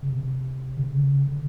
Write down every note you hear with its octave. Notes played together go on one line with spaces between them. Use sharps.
C#3
C3
D3
C#3
D3